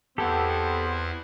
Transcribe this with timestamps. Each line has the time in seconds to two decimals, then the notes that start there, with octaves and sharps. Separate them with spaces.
0.18 E2 B3 C4 E4 G4 A4